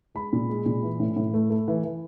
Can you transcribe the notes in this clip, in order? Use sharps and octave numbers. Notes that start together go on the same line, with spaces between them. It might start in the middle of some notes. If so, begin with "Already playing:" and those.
G#3 B5
A#2
G#3
A#2
E3
A2
A2
A3
A3
E3
E3